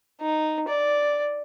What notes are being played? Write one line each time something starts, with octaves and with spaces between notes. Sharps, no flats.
D#4
D5